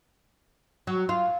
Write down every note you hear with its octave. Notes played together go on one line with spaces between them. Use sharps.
F#3
F4